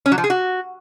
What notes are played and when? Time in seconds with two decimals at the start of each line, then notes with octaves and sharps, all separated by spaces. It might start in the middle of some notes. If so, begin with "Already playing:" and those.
0.06 C#4
0.12 F#3
0.18 F3
0.24 G#4
0.30 F#4